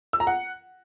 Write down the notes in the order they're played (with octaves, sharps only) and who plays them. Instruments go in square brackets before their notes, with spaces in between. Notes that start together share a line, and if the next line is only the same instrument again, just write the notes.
[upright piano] E6
A#5
F#5